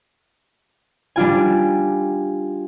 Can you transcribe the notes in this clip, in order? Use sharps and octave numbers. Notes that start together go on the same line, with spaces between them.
G3 D4 F4 G#5